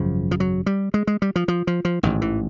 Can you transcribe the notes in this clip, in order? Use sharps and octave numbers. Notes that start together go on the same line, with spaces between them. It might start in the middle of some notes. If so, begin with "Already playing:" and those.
Already playing: G#1 F#2 C#3 F3
F3
F#3
G3
G#3
G#3
G3
F3
F3
F3
F3
A1 G#2 D#3
E3